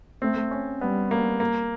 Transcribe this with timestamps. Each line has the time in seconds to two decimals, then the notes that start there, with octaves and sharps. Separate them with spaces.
0.22 A3 C4
0.51 C#4
0.81 G3 B3
1.11 A#3
1.40 A#3